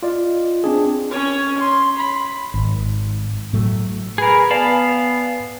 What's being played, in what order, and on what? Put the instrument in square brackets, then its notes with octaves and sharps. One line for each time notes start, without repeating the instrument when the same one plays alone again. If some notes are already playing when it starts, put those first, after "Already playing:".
[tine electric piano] F4 D5 D#5
C4 D4 G#4
[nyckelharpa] C#4 C#5
C6
B5
[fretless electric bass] G#1
A2 F#3 A3
[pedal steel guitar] G#4 A#4 [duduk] B4
[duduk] B3 [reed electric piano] B4 D5 G#5 [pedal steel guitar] F5 A5 B5